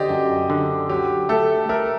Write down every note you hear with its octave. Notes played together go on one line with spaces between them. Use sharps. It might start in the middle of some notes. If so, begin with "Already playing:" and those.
Already playing: D3 G4 C5 D5 D#5
F#2
D3
F#3 G4
A3 A4
A3 A#4